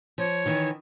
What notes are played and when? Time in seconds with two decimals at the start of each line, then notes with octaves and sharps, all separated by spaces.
0.18 F3 C#5
0.46 D#3 E3 D#4